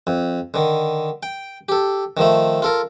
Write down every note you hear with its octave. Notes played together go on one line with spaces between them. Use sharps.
F2
D3 D#3
G5
G4 A4
D#3 F3 A3
F4 A4 A#4